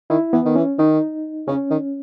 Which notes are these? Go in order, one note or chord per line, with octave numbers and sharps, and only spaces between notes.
D#3 E4
E3 B3
D#3
E3 C#4
D#3 D#4
C#3 C#4
D#3